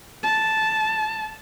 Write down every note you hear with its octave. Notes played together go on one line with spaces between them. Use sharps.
A5